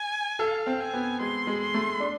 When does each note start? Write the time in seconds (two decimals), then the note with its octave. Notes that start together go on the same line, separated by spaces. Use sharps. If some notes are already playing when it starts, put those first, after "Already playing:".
Already playing: G#5
0.39 A4 F5
0.67 C4
0.80 G#5
0.93 B3
1.20 G#3 C6
1.47 G#3
1.61 C6
1.74 A3
2.00 D4